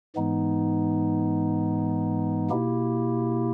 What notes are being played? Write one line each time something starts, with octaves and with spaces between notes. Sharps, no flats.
G#2 E3 G#3 B3 D#4
B2 A#3 E4 G4